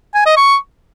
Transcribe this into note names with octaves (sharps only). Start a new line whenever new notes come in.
G#5
D#5
C#6